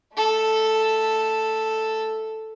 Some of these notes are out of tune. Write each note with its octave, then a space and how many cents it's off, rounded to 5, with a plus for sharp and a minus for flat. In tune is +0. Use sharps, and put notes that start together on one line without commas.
A3 +0 A4 +0